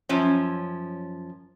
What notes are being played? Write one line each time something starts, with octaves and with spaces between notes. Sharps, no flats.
F#2 F3 C#4